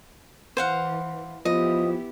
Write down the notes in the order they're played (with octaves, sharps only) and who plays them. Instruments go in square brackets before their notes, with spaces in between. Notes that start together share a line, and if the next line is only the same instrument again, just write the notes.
[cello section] E3 [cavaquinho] C5 F5 F#5
[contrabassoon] F3 [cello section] B3 E4 G4 [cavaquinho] D#5